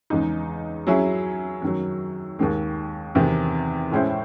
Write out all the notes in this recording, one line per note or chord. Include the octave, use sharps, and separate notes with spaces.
E2 C#3 G#3 D#4
F#3 C#4 E4 G#4
F#2 D#3 F#3
D#2 D#3 G#3
E2 C3 D#3
A2 G#3 C#4 E4 C5